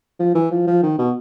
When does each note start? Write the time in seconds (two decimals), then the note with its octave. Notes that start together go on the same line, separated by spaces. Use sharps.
0.20 F3
0.35 E3
0.51 F3
0.67 F3
0.83 D#3
0.99 B2